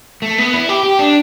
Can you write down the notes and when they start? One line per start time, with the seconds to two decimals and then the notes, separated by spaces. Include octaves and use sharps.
0.22 A3
0.38 B3
0.53 E4
0.69 G4
0.83 G4
0.99 D4